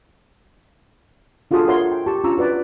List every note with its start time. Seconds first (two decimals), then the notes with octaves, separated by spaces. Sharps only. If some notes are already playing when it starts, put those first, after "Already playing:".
1.51 D4 F4 F#4 G#4 A4 D#6
1.67 F#4 A#4 C#5 E5 F#5 C6
1.91 G5
2.06 G4 A5 C#6
2.24 C#4 D4 F4 A#5 C#6 E6
2.38 F#4 B4 D5